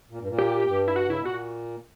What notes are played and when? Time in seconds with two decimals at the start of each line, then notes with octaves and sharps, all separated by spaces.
0.10 A#2
0.19 G2
0.28 A#2
0.39 G4
0.67 G2
0.88 E4
0.96 F#4
1.08 C#3 E4
1.17 B2
1.24 A#2 F#4